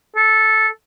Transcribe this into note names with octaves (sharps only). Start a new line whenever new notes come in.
A4